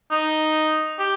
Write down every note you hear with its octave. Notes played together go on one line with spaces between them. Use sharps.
D#4
G4